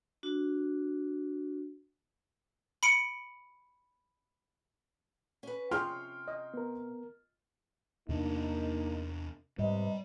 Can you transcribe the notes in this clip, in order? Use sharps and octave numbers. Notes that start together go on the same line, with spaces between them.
D4 F#4
B5 C#7 D7
C#4 B4
C3 C#4 F4 G#4 F5 G5 C6 F6
D#5
B3 A#4
E2 C3 A#3 D4 D#4
G#2 C3 G3 B4 D#5